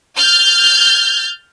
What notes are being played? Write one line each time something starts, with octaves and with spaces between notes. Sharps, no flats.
F6 G6 A6